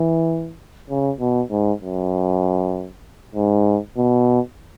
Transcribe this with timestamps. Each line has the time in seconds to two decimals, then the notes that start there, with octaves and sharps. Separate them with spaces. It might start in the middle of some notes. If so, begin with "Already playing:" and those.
Already playing: E3
0.90 C#3
1.20 B2
1.51 G#2
1.81 F#2
3.35 G#2
3.97 B2